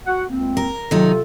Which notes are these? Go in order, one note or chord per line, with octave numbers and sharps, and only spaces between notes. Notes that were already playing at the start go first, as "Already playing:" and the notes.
F#4 F#5
C#2 A#3 C4
A#4
C3 D#3 F#3 D#4 F4 A4